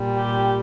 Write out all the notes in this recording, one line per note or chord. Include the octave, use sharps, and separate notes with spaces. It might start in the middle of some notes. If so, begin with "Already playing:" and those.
Already playing: A#2 G3
G4